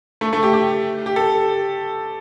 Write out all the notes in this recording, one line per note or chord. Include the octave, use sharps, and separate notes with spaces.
A3
A3
G4
G4
G4
A4